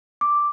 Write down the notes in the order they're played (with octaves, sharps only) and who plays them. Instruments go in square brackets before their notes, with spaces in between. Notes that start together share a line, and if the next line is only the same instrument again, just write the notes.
[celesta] D6